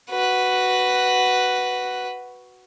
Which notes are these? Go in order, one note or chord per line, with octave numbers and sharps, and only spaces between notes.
F#4 B4